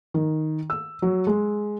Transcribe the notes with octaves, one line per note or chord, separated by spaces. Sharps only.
D#3
E6
F#3
G#3